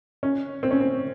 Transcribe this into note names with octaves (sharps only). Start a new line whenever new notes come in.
C#4
C4
C#4
C4